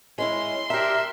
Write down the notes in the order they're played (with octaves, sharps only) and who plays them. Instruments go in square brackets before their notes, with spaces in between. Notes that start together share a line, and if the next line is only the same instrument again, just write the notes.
[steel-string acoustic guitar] G#3 C#4 E4 [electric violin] C6
[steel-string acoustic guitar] D4 G4 [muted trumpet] A#4 [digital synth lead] E5